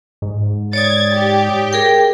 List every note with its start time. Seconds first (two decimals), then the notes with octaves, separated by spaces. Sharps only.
0.22 G#2
0.73 C#5 D5 D#6 G#6 A6
1.14 G4
1.73 G#4 A#4 G5